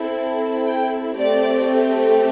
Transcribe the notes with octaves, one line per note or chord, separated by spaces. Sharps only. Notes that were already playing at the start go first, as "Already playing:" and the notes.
Already playing: C4 E4 A4
G5
A3 C4 G4 D5